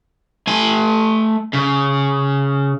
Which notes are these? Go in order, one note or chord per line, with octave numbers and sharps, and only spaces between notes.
A3 G#5
C#3